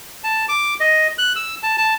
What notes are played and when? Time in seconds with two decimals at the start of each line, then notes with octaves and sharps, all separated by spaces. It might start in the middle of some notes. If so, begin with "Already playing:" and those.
0.24 A5
0.49 D6
0.80 D#5
1.18 F#6
1.36 E6
1.63 A5
1.78 A5